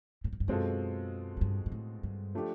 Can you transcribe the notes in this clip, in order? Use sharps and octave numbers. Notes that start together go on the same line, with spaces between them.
A2
G#2
G2
F#2 B2 G#3 C4 F4 A4
G#2
G2
G#2
A2
G2
F3 A3 D4 G4